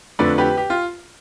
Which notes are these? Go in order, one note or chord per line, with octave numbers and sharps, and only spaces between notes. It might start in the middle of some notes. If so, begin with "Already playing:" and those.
F2 D3 A3 D4 B4 D5
G4 B4
G4
F4